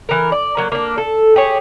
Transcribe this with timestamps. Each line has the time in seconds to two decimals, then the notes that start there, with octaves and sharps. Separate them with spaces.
0.09 E3 A#4
0.32 D5
0.57 F#3 A#3
0.72 A#3 D4
0.98 A4
1.36 G4 G#4 C#5